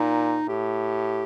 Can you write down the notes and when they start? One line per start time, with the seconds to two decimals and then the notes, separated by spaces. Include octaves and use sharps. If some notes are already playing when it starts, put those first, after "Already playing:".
Already playing: A#2 D#4
0.48 A2 G4